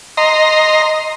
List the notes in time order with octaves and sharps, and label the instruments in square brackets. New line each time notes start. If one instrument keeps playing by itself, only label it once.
[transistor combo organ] D#5 A#5 C6